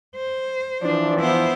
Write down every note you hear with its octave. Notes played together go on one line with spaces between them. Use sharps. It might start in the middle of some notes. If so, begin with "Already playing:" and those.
C5
E3 F3 D4
B3 E4 C5